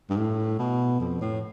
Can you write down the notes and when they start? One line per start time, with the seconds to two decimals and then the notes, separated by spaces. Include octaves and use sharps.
0.10 G2
0.16 A2
0.59 B2
1.00 F2
1.21 A2